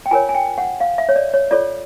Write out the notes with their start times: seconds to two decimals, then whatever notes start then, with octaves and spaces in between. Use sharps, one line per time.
0.06 G5
0.11 F4 A#4 C#5 G#5
0.29 G#5
0.34 G5
0.58 F#5
0.80 F5
0.98 E5
1.09 C#5
1.16 D5
1.33 C#5
1.51 F4 A4 C#5 D5